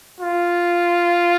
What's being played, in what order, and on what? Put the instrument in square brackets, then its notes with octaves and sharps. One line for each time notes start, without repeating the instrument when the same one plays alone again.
[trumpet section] F4